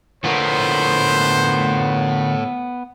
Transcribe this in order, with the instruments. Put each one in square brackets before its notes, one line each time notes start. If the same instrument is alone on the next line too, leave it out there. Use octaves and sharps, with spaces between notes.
[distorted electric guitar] A2 [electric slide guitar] D3 F4 A#4 [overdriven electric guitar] B3 [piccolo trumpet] C5